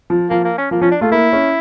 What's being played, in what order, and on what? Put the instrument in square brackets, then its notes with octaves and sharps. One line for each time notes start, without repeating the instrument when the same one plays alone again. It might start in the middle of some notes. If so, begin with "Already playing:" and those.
[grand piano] F3
[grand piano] F3 [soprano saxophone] A#3
[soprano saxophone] A#3
C#4
[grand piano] F3 [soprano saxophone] A#3
[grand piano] F3 [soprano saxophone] C#4
[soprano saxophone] D4
[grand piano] A3 [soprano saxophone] F4
[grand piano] A#3 [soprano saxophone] E4
[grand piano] C#4